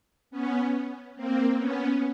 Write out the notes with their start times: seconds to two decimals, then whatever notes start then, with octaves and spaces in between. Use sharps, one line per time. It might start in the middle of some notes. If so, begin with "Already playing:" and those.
0.30 B3 C#4
1.16 A#3 C4
1.57 B3 C#4